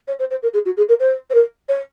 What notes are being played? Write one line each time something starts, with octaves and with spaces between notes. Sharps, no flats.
C#5
C5
C5
A#4
G#4
F#4
G#4
A#4
C5
C5
A#4
C#5